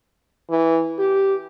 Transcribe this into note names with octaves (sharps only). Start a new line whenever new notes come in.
E3
G4